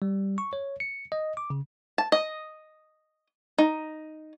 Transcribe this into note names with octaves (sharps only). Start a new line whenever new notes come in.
G3
C#6
C#5
C#7
D#5
D6
C#3
A5
D#5
D#4